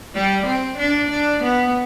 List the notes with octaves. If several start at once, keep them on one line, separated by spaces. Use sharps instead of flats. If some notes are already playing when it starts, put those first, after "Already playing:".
G3
C4
D4
D4
B3